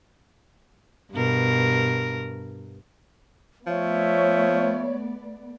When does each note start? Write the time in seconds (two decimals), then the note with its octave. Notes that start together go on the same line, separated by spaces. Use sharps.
1.12 G2 B2 A#4
3.67 F3 A3 B3 C#5 D5 E5